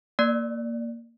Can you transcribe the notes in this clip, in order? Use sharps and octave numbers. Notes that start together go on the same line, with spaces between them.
A#3 D5